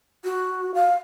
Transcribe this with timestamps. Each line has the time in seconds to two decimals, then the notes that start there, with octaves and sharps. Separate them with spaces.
0.24 F#4
0.74 F5